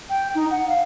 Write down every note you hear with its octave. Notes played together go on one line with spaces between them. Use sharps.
G5
D#4
F#5
F5